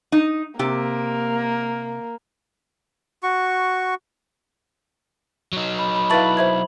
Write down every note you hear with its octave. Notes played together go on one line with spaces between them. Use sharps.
D#4
C3 A#3 G4
F#4 C#6
F#3 D#4
B5
B5
E4 B4 F5 A5 C#6 A6 F#7
C5 E5 G#6